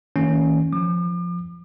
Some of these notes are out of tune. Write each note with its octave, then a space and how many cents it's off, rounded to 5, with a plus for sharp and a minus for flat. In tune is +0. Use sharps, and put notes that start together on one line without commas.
D#3 +40 A#3 -40 C#4 +0
F3 +0 D6 +40